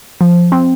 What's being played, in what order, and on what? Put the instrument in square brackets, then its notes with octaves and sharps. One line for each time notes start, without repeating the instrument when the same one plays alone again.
[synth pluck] F3
C4